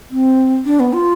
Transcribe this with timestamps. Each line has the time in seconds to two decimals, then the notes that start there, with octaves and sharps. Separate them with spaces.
0.11 C4
0.65 D4
0.80 B3
0.93 F4